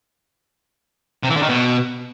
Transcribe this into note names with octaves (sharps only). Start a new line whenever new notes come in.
C3
E3
D3
D#3
B2